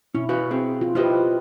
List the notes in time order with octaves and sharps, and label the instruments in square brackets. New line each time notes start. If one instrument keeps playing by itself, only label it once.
[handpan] B2 E4 [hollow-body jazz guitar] C#4
[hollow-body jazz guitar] F#4 B4 F5
C4 G#4
[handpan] F4
[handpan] E4 G4 B4 [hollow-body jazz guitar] F4 C5 D#5